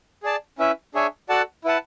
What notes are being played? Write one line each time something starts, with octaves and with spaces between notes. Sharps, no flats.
G#4 D5 A5
C#4 E4 B4 E5
D4 G#4 C#5 E5 G#5
F#4 A4 D5 F#5 A5
E4 B4 F#5 A5